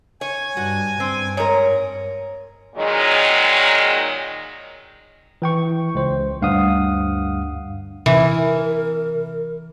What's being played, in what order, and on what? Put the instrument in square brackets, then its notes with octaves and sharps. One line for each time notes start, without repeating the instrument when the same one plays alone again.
[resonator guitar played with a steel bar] C#5 [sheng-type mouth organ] G#5
[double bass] G2 [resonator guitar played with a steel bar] F#4
[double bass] G2 [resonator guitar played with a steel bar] C4
[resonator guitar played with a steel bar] G#2 A#4 [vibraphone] C#5 A#5
[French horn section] A#2 D#3 F#3 G#3
[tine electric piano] E3 G5 C#6
C#2 C5
D2 G2 F5 F#5 D#6
[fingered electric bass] C3 [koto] E3 [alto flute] A#4